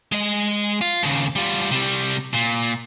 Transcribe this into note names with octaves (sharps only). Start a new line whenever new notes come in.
G#3 D#5
F4
D#2 C#3
G3 F4
C3 G3
A#2